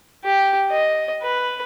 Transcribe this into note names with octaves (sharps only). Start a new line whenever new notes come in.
G4
D#5
B4